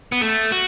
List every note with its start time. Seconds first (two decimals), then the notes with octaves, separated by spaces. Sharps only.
0.12 B3
0.21 A3
0.52 F#4